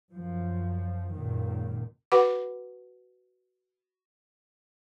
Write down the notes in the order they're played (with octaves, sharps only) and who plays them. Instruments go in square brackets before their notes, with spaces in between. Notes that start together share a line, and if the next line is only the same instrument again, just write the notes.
[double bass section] F#2 F3
C#2 F#2 A#2 D#3
[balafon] F#4 B4 F#5 B5 D6